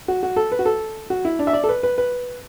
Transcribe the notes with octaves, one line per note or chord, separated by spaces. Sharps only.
F#4
F#4
A4
B4
F#4
A4
F#4
E4
D4
E5
D5
A4
B4
B4
B4